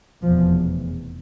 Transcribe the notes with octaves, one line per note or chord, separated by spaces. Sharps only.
F1 E2 B2 F3